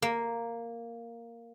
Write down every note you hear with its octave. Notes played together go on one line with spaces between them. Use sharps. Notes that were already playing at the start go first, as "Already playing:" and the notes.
A#3